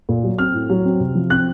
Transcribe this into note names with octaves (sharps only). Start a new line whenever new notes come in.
A#2
F#3
C4 F6
A2
F#3
C4
C3
F3
C4 F#6